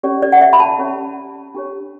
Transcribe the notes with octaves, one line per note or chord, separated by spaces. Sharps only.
C#4 G4 C#5 D5
D5
F#5
E5
B5
A5
C#4 G4 C#5
D4 G4 C#5